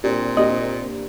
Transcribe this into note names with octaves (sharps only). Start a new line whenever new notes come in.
A#2 C4 D4 G4
A#3 D4 G4 D#5